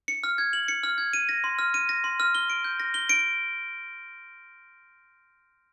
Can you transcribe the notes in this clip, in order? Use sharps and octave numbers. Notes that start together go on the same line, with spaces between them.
C#7
F6
G#6
F#7
C#7
F6
G#6
D#7
A#6
C6
F6
D#7
A#6
C6
F6
G7
D7
G6
A#6
G7
D7